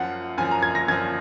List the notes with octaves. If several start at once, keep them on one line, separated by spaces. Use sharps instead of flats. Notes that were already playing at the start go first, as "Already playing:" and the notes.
Already playing: F#2 F3 F#5
F#2 F3 G#5
A#5
G#6
A#6
F#2 F3 G#6